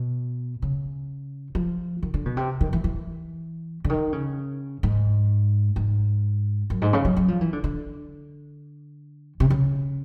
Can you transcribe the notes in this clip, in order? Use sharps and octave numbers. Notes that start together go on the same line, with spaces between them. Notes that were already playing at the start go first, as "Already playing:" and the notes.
Already playing: B2
C#3
F3
D#3
D3
B2
C3
D#3
E3
E3
D3
D#3
C#3
G#2
G#2
F#2
G#2
C#3
F#3
F#3
F3
E3
D3
D3
C3
C#3